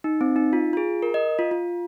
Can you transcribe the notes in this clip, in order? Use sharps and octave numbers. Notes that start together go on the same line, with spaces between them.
D#4
C4
D#4
F4
F4
G#4
A#4
D#5
F4
F4